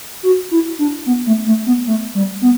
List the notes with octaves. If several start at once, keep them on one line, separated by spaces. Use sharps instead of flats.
F#4
E4
D4
B3
A3
A3
B3
A3
G3
B3